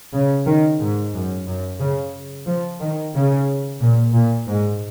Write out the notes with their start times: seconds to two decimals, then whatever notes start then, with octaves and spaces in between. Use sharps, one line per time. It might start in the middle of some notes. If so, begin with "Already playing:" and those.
0.13 C#3
0.46 D#3
0.80 G#2
1.14 F#2
1.47 F#2
1.79 C#3
2.47 F3
2.80 D#3
3.15 C#3
3.80 A#2
4.14 A#2
4.47 G#2